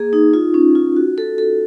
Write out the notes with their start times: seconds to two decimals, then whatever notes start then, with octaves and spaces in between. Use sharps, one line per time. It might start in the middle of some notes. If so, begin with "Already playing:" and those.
Already playing: A#3 G#4
0.13 D#4
0.34 F4
0.54 C#4
0.75 F4
0.96 F#4
1.18 A4
1.38 A4